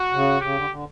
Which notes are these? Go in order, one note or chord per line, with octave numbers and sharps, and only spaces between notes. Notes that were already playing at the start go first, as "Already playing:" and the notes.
Already playing: F#4
C#3
C#3 G4
D3
D3